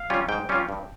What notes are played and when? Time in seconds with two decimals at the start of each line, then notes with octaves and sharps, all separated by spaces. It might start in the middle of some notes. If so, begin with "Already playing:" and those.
Already playing: F5
0.10 G3 C#4 F4
0.28 G#2 G5
0.49 G3 C#4 F4
0.69 G2